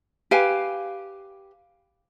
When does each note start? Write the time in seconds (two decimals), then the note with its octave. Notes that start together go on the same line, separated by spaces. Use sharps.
0.31 G4 B4 F5 G#5